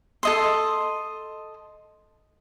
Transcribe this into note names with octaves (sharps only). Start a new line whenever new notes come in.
A4 D#5 C6